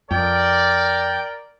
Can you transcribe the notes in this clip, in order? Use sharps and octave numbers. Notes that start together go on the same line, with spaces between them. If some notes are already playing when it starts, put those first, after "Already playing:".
F2 A#4 D5 G5